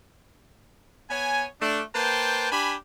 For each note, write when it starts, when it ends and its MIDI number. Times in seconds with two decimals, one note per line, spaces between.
1.10 1.45 59
1.10 1.45 73
1.10 1.45 80
1.62 1.82 57
1.62 1.82 62
1.95 2.48 58
1.95 2.48 71
1.95 2.48 72
1.95 2.48 79
1.95 2.48 81
2.52 2.75 62
2.52 2.75 67
2.52 2.75 80
2.52 2.75 83